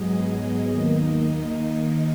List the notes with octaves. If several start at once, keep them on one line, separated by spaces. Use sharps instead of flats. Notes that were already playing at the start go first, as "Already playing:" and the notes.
Already playing: G#2 F#3 B3 G#4 D#5
D#2 D#3 A#3 D#4
D#5